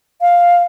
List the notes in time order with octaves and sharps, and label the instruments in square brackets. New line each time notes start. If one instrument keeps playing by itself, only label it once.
[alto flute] F5